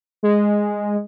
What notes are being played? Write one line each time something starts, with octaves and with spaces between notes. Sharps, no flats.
G#3